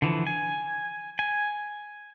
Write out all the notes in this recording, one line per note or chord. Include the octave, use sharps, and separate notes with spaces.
D3 E3 F3
G#5
G#5